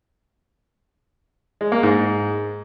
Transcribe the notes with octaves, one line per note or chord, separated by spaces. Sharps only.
G#3
A#3
G#2